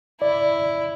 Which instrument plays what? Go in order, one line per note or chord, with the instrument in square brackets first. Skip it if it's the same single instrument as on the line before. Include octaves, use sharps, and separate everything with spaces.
[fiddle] E4 [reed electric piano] D5